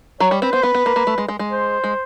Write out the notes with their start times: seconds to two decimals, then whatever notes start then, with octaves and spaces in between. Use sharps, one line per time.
0.20 F#3 C#5
0.31 G3
0.42 C4 B4
0.53 B3 C5
0.63 B3 B4
0.75 B3
0.86 A#3
0.96 A#3
1.07 A3
1.18 G#3
1.28 G#3
1.39 G#3
1.50 C5
1.84 G#3